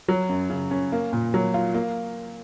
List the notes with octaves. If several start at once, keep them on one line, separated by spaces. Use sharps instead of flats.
F#3
F#2
C#3
C#4
A#3
A#2
F#3
F4
A#3